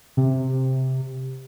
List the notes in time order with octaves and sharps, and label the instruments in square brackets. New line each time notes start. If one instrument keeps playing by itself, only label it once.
[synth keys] C3